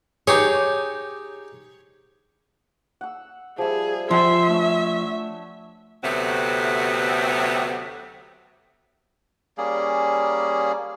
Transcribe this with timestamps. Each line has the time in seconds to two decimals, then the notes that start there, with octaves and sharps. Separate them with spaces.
0.27 D#4 G4 G#4 C#5
3.01 F#5 E6
3.58 F3 G3 G#4 E5
4.11 F3 C4 E5 F#5 G#5 C6
4.49 A3 D4 C#5
6.04 D2 C3 F#3 A3 B3 C4
9.58 G3 A#3 C#4 G#4